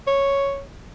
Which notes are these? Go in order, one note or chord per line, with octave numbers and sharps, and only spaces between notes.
C#5